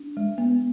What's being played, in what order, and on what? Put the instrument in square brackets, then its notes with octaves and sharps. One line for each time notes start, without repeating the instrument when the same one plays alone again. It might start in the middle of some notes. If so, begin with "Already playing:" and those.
Already playing: [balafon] D4
G#3
B3